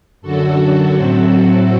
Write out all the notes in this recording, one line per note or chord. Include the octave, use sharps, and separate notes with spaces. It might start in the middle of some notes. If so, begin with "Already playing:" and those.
F#2 D3 F#3 F#4 A4
A2 F#3 A3 C4 F#4 A4